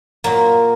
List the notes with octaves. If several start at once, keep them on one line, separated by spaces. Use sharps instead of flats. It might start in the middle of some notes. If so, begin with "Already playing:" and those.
A#2 F#3 A#3